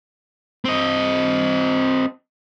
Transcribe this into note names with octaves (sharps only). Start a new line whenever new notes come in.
C4 D#5